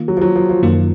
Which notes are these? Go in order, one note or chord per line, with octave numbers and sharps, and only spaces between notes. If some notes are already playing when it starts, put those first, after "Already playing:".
Already playing: D#3 A#3 F4
F#3
F3
F#3
F3
F3
F#2 D#3 A#3 F4